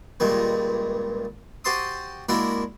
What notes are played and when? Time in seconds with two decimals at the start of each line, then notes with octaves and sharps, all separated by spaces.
0.20 C#2 G2 A#2 D#3 G#3
1.65 F#4 G4 C5 A5 C6 D#6
2.29 G#3 A#3 D4 E4 F#4